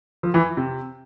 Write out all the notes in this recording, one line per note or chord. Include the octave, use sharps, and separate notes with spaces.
F3
E3
C3